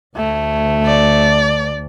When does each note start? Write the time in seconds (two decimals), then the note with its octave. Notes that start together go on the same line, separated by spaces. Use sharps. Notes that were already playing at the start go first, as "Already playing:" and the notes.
0.16 D2 A3
0.86 D5